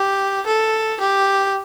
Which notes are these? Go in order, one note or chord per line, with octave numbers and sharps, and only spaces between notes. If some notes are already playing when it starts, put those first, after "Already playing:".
Already playing: G4
A4
G4